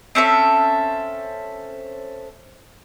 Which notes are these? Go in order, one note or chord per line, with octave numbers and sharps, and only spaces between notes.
C4 C#4 A4 E5